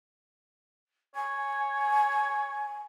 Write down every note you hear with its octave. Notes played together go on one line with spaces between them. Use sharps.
C#5 G#5